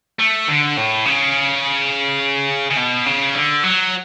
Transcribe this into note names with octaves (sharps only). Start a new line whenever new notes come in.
A3
D3
A2
C#3
C#3
B2
C#3
D3
F#3